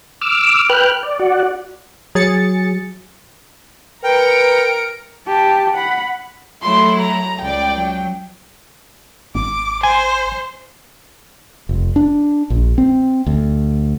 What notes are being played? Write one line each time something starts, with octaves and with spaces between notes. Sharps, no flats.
D6 E6 F6
B4 G5 F6 F#6
D5
F#4 D5 F#5
F#3 G#4 A6 C#7
A#4 B4 G5 A#5 C#7 D7
G4 A5
F#5 B5
F#3 A3 E4 C6
A#5
C#2 D5 G5
F#3
G#1 D6
C5 G#5
F1
D4
A#1
C4
D2